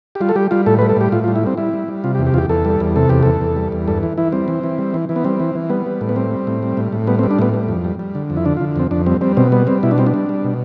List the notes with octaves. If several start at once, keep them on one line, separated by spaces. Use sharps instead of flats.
G4
G3 F4
A4
G3 G4
G3 F4
A2 A4
B4
G3
A4
A2 G4
A2 F4
F4
G3
E4
G3 C4
G3 E4
G3
G3
C3 F4
G4
E2
G4
E2 F4 G4
E2 A4
G3
E2
C3 A4
E2 G4
E2 A4
E2
G3
E2
G2 A4
E3
E3 E4
G3 C4
E3
E3
G3
E3
E3
B3
G3 C4
E3
E3
G3 B3
G3
A2
B3
G3 C4
G3
A2
G3
A2
A2
G3 B3
C4
G3
D4
A2 B3
G3
F2
G3
G3
D3
F2
E4
D3 D4
F4
D3
F2 C4
F2 D4
G3 C4
G3 C4
B2 C4
G3 B3
G3 C4
B2 E4
D4
G3 C4
D4
G3
G3
B2